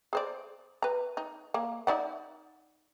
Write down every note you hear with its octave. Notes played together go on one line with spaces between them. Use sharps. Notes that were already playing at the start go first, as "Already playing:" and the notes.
G#4 C5 D5
B4 A#5
D#4
A#3
D#4 D5 F#5